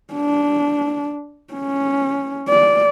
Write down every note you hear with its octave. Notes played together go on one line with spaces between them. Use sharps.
D4
C#4
D5